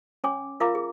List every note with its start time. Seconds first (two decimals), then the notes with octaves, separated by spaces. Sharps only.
0.24 C#4 C#5 G#5 D6
0.60 F4 A#4 E5 F5 A#5 D6
0.75 G#4